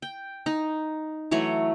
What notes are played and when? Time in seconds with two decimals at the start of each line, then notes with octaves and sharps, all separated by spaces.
0.02 G5
0.46 D#4
1.31 E3 F#3 A3 C#5